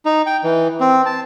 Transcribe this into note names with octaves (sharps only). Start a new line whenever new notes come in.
D#4
G5
E3
C4
A5